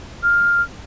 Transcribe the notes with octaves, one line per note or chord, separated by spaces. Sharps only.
F6